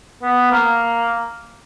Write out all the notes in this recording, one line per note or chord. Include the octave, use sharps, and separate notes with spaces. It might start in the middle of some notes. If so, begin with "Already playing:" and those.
B3
A#3